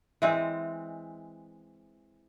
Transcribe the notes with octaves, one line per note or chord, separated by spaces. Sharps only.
E3 G#3 C4